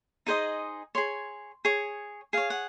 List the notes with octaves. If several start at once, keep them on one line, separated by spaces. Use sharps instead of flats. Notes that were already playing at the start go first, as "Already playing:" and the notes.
D#4 G#4 C5 D#5
G#4 C#5 C6
G#4 C#5
G#4 C#5 F5
F#5